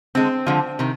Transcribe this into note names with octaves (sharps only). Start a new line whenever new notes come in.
D3 G#3 C4
D3 F3 G#3
C3 D#3